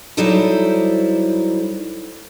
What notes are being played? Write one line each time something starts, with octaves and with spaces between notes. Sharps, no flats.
F#3 G3 D#4 E4 A4 C5